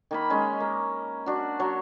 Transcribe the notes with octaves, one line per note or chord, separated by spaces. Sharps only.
D#3 A#3 B5
G#3 C#4
A#3
D4 F#4
F#3 C#5